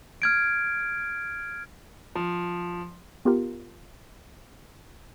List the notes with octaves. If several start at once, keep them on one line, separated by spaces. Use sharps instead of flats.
F6 G#6 D7
F3
B3 F4 G4 A#4